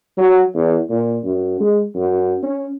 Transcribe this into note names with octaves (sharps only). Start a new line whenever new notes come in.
F#3
E2
A#2
F#2
G#3
F#2
C#4